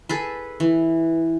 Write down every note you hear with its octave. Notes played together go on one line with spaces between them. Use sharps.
G#4 A4 B4
E3